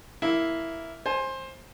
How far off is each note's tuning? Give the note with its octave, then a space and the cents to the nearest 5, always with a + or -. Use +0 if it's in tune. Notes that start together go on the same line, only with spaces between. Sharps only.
A#3 +0 E4 +0
C5 +20 G#5 +0